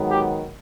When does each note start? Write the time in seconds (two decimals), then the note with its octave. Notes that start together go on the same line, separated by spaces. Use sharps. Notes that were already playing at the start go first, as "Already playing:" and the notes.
Already playing: G#2 D#3 F#3 B3
0.11 G4